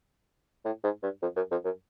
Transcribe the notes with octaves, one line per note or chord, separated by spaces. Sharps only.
A2
G#2
G2
F2
F#2
F2
F#2